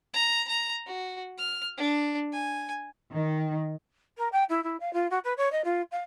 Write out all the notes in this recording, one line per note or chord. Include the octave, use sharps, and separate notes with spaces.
A#5
A#5
F#4
F6
D4
G#5
D#3
A#4
G5
E4
E4
F5
F4
F#4
B4
C#5
D#5
F4
F5